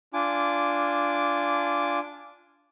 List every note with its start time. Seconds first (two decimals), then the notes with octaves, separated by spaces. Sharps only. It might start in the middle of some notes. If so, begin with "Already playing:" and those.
0.14 D4 F4 G#5 D6